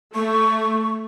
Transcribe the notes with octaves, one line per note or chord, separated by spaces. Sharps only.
A3 C#6